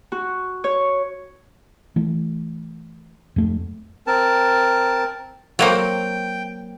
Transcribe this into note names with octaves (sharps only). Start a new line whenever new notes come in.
F#4
C#5
E3 A3
F2 A3
C4 A#4 A5
F#3 A#3 C4 G5